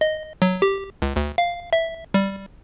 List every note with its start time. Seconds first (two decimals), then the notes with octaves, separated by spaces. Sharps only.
0.01 D#5
0.42 F#3
0.62 G4
1.02 C#2
1.16 D2
1.38 F5
1.73 E5
2.14 G3